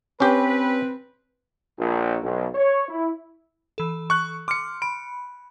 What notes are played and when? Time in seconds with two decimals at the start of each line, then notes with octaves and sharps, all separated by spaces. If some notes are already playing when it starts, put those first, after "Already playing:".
0.20 C4 C#4 G4 B4
1.78 A#1
2.23 B1
2.54 C#5
2.88 E4
3.78 E3 A4
4.10 C#6 F#6
4.48 C6 D6 F6 C#7
4.82 B5 D7